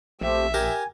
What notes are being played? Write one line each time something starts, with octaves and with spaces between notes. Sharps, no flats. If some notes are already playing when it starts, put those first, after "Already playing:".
A#1 A3 C4 G4 E5
G4 A#4 G#5